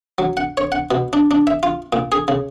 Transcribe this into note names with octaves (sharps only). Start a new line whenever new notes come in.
F#3
F#5
C#5
F#5
B2
D4
D4
E5
F4
A#2
G#4
C#3